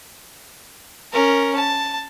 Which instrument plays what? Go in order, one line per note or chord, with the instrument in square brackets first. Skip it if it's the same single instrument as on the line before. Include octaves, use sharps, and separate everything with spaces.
[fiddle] C#4 A#4
A5